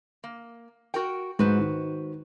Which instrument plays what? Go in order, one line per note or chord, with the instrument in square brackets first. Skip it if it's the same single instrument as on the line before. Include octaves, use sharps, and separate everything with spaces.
[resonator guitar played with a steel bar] A#3
F#4 A#4 G5
[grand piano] G#2 [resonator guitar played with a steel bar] F#4 B4 C5
[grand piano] D#3